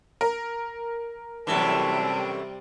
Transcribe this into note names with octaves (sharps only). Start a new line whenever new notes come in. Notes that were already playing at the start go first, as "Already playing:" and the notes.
A#4
F#2 A2 C3 E3 G3 A5